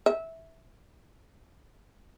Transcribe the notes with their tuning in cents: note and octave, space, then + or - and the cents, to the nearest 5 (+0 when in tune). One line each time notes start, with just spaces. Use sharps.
E5 -10